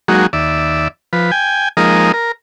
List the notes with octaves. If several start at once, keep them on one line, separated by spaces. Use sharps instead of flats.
F#3 G#3 A#3 D#4 F#4
D#2 D5 E5
F3 B4
G5 G#5
F3 G#3 A#3 D#4 A#4 D#5
A#4